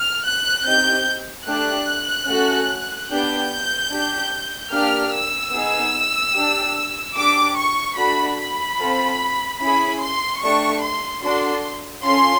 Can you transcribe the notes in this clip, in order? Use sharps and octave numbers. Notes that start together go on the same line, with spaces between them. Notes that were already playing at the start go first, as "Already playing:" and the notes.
Already playing: F6
F#6
C4 D#4 G4 G6
A3 D4 G4 F#6
A3 C#4 F#4 A4
B3 D4 G4 G6
D4 G4
A#3 D4 G4 F6
E6
B3 D#4 G#4
D4 G4
D4 G4 D6
C#6
A3 D4 F#4 B5
B5
C4 F4 A4
C#4 E4 G#4 B5
C6
A3 D4 G4 C#6
C6
D4 F#4 A4 C6
C#4 F4 A4 C6